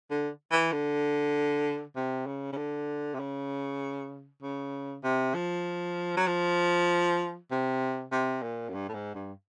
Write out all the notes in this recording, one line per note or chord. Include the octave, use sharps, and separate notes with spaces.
D3
E3
D3
C3
C#3
C#3
D3
C3
C#3
C#3
C3
F3
F#3
F3
C3
C3
A#2
F#2
G2
A2
G#2
G2